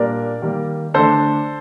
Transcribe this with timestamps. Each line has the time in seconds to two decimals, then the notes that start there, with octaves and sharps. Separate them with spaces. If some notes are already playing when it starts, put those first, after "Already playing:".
Already playing: A#2 G3 A#3 D4 A#4 D5
0.42 D#3 G3 A#3
0.94 D3 A3 D4 A4 C5